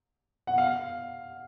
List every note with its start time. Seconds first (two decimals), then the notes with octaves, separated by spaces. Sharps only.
0.47 F#5
0.58 F5